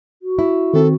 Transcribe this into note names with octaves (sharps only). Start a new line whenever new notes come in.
F#4
E4
D#3 C4 A4